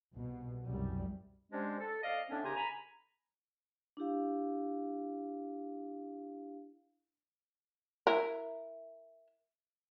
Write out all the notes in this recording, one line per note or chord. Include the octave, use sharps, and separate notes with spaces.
C2 B2
C2 F#2 G3
G3 G#3 C#4 D4 G4 C5
A4
F2 D5 D#5 F5
A2 B3 C#4 D4
C2 C#3 G4 G#5 A#5 C6
G#5 A#5 B5
D4 E4 G4 F5
E4 A#4